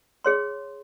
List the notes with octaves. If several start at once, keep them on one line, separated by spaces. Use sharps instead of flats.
G#4 C#5 C6